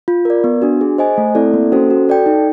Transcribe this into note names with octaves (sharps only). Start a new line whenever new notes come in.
F4
A#4 D5
B3
D4 F#4
G#4
C5 D#5 G#5
A3
C4 E4 A4 D5
A#3
C#4 F#4 A4 C5
F#4
A4 D5 G5
D#4